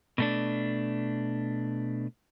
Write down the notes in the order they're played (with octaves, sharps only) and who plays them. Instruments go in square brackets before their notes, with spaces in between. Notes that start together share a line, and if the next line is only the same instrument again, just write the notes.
[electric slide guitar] B2 A3 D4